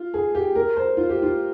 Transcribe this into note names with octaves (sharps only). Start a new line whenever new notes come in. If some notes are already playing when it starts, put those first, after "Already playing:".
Already playing: F4
G#4
G4
A#4
C5
F4
G4
F4